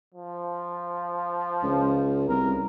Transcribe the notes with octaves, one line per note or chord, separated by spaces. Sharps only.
F3
C#2
C2 A#4